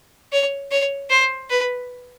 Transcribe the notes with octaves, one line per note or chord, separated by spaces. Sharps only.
C#5
C#5
C5
B4